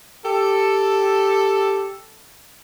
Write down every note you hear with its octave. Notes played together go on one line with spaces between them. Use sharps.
G4 A4